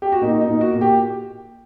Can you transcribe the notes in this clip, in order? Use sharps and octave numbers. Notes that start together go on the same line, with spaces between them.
G4
F#4
A#2 D#4
D#4
A#2
F#4
A#2
G4